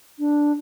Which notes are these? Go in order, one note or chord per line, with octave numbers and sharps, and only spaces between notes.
D4